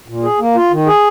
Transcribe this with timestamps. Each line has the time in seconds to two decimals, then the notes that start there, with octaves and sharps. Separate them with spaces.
0.08 A#2
0.23 G#4
0.40 A#3
0.55 F4
0.71 D#3
0.86 G#4